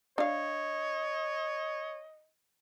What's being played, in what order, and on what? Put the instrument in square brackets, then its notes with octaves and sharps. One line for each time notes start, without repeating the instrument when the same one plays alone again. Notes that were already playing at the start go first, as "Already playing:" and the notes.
[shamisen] D4 F5 [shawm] C#5 [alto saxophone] D#5